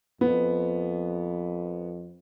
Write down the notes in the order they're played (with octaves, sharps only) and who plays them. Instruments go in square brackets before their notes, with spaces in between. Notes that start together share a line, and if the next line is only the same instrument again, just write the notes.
[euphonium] F2 [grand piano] B3